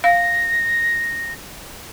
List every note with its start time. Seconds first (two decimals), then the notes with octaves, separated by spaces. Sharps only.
0.04 F5 A#6